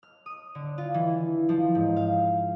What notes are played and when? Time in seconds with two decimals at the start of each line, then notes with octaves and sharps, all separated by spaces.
0.03 F6
0.26 D#6
0.55 D3
0.78 F4
0.94 E3
1.49 F3
1.75 G#2
1.96 F5